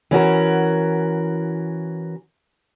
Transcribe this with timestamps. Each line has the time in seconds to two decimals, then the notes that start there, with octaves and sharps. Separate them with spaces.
0.11 E3 C#4 F#4 A#4